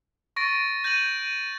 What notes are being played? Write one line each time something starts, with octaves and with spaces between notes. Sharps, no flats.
C#6 A6 A#6 D7
G6 A#6 D#7 F#7